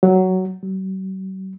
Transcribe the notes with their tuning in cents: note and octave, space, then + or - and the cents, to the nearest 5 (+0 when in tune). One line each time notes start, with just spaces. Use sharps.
F#3 +10
F#3 +45